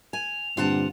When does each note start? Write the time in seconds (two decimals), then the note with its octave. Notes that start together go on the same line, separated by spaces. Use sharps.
0.13 G#5 F7
0.57 G2 A#2 D3 C4 F4 F#5 A5